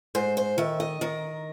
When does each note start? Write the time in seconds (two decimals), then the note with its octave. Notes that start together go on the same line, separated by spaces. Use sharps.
0.15 G#2 C5
0.37 C5
0.58 D#3 E5
0.80 D#5
1.01 D#3 A#4